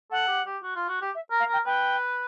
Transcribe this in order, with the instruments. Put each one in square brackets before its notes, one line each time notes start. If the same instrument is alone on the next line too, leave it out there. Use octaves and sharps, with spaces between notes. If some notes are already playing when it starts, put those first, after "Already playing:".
[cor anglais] A4 [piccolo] F#5
[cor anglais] G4
G4
F#4
F4
F#4
G4
[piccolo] E5
[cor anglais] A#4
[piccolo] F5
[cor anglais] A#4 [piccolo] G5
[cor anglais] B4 [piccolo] G5